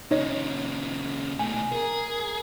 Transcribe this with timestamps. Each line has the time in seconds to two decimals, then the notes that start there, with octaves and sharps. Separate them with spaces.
0.11 A#2 C#3 D#4 C#5 D#5
1.39 B2 A3 G#5
1.72 G#4 A#4